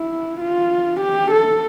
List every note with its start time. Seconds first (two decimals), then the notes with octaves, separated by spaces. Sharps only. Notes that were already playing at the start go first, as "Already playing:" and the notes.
Already playing: E4
0.41 F4
1.01 G4
1.32 A4